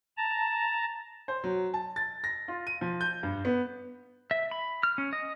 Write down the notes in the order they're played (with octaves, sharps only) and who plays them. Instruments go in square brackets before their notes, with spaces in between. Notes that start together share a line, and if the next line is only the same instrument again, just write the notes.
[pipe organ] A5 A#5
[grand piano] C5
F#3
A5
A6
A#6
F4
D#7
F3
G6
G2
B3
[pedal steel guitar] E5
B5
F6
C#4
D#5